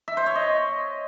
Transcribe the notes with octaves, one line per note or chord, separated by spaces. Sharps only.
E5
C5
C#5
D#5